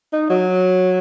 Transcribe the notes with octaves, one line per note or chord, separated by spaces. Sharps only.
D#4
F#3